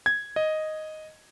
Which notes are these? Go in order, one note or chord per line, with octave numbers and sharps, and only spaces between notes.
G#6
D#5